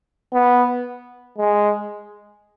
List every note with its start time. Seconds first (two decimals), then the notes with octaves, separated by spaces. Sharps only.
0.33 B3
1.38 G#3